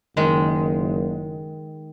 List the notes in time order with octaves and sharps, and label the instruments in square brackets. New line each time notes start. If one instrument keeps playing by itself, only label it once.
[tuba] F#1 [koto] D#3 G#3